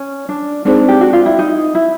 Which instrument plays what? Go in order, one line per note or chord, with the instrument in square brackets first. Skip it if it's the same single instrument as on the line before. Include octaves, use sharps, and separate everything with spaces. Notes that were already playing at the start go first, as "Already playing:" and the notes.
Already playing: [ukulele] C#4
D4
[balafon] G#3 C4 D#4 G#4 C5 [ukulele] D4
[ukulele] G4
F#4
F4
E4
D#4
E4